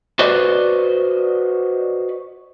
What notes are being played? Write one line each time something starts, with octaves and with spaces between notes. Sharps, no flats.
F#4 B4 C5 D5 D#5